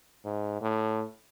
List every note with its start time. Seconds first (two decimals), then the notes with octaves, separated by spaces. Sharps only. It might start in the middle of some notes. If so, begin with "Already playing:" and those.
0.25 G#2
0.61 A2